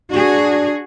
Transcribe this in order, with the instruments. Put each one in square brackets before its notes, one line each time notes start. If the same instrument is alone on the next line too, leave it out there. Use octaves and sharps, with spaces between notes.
[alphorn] D4 [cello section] F#4 G#4